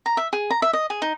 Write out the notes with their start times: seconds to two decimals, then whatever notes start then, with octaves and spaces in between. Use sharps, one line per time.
0.06 A#5
0.17 E5
0.33 G#4
0.51 A#5
0.62 E5
0.73 D#5
0.90 G#4
1.02 D#4